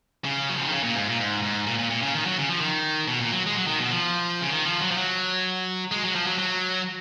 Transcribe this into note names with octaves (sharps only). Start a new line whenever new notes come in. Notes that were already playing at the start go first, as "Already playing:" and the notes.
C#3
F#3
F3
D#3
C#3
A#2
G#2
A#2
G#2
G#2
A#2
A#2
A#2
C#3
D#3
F#3
C#3
F3
D#3
B2
A#2
F#3
G#3
F#3
D#3
B2
F3
C#3
D#3
F3
F#3
F3
F#3
G#3
F#3
F3
F#3
F#3